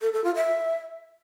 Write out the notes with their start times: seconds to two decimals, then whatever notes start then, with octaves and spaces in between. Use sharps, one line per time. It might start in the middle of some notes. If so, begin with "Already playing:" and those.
0.02 A4
0.13 A4
0.24 F4
0.35 E5